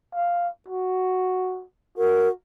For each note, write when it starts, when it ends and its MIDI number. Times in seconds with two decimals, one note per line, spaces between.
0.14 0.48 77
0.68 1.64 66
1.98 2.31 66
1.98 2.28 70